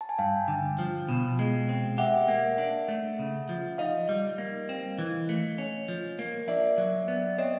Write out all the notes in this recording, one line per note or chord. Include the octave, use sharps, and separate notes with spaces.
A5
G#5
G2 F5 G5
D3
F3
B2
G#3
C4
G4 E5 F#5
A#3
D4
A3
C#3
F3
D#4 D#5 F5
G3
A#3
C4
E3
A3
C#4
F3
A#3
D4 D5 E5
F#3
B3
C4 C#5 D#5